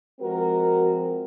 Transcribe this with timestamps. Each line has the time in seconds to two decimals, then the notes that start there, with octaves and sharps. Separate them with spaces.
0.20 F3 G#3 C4 F#4 A#4